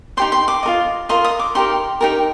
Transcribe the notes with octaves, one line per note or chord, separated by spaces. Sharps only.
D#4 G4 C5 C6
C6
D6
F4 A#4 D#5
F4 A#4 D#5 C6
D#6
D6
D#4 G4 A#4 C6
D#4 G4 A#4